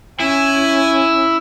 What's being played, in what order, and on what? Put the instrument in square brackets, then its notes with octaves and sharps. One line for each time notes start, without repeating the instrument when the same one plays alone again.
[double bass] C#4 [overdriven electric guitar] E4 [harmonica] G#5